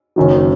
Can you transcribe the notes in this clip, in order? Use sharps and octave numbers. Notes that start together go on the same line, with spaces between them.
F#1 F#2 D#3 F#3